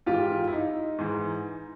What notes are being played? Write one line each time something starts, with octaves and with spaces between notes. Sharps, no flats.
G#2 E3 F4 G4
E4
D#4
G#2 E3